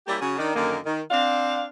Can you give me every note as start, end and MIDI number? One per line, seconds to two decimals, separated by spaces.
0.07 0.17 55
0.07 0.17 58
0.07 0.17 61
0.07 0.17 64
0.07 0.17 67
0.07 0.17 74
0.20 0.36 49
0.20 0.36 54
0.20 0.36 61
0.20 0.36 66
0.37 0.52 51
0.37 0.52 62
0.54 0.76 42
0.54 0.76 50
0.54 0.76 51
0.54 0.76 58
0.85 1.01 51
1.10 1.65 60
1.10 1.65 62
1.10 1.65 77